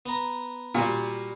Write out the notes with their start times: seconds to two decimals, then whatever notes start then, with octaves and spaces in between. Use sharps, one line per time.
0.06 B3 A#5
0.75 A#2 G3 F#4 G4